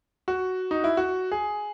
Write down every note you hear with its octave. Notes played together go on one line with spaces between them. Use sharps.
F#4
D#4
E4
F#4
G#4